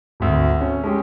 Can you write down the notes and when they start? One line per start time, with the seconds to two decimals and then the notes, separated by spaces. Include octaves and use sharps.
0.20 G#1 D2
0.61 C#4
0.84 G#3 C#4 G4